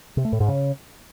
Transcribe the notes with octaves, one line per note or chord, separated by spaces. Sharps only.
C3
A3
A2
G#2
C#3